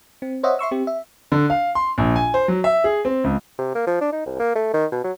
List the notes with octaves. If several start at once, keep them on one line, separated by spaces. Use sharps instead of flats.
C4
C5 C#5 D#5 E5 F#5
E5 C6 C#6 E6
C4 G4
E5
D3
F5
C6
A#1
G#5
C5
F#3
E5
G#4
C4
C#2
C3
A#3
F3
D4
D#4
C2
A#3
A3
D#3
B2
F#3